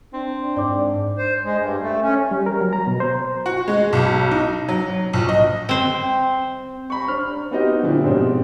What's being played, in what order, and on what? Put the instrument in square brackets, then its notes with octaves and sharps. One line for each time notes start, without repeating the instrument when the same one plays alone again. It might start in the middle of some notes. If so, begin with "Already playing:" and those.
[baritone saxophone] C4 [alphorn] D4
[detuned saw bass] G#2 [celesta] D5 D6
[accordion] C5
G#3
G2
A3
C#4
[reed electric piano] G3
A#4
F#3
A#5
B2
C5
[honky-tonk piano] F#4
G#3
B1
D#4
F#3
A#1
D#5
[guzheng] C4 C5
[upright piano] A#5 B5 C#6
D4 C5 F6
B3 C4 D#4 F#4 G4 D#5
A#2 D3 F3 D4 E4
G#2 B2 C4 G4